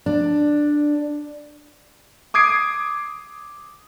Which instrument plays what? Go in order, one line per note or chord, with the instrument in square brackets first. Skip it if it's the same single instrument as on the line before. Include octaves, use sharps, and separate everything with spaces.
[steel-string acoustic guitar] D4
[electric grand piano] D6 D#6 G#6 C7 D7